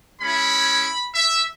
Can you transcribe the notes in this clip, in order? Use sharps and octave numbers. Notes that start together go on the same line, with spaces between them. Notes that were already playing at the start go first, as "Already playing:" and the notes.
G#3 C#4 E4 B5
E5